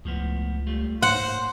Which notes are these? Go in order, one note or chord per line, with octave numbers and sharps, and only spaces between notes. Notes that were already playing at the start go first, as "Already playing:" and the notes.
C#2 A2 F3 B3
G3 A3 F4
G#2 A#3 C5 F#5